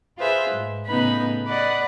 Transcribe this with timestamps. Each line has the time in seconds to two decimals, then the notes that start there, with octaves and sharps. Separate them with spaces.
0.18 F4 G#4 B4 C5 E5
0.49 G#2
0.88 A2 C#3 B3 D#4 B5
1.46 B4 D5 D#5 F#5